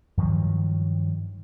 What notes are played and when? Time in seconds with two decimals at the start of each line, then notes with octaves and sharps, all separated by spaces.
0.17 G2 D#3 F3 F#3